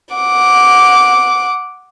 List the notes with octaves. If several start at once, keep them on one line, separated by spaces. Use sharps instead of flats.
F#5 D6